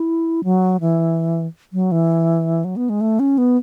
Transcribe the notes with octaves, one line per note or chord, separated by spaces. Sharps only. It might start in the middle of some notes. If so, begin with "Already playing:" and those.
Already playing: E4
F#3
E3
F#3
E3
F#3
B3
G#3
A3
C#4
B3